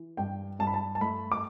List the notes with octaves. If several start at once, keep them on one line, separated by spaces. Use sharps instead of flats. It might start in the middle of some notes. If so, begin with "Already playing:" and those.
Already playing: E3
G2 G5
G2 A5
B5
A5
A5
A3 B5
D6